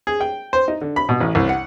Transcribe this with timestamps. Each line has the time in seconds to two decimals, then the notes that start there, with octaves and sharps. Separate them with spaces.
0.07 G#4
0.20 G5
0.53 C5
0.68 D#4
0.81 D3
0.96 B5
1.09 B2
1.20 A1
1.35 C2
1.49 F#5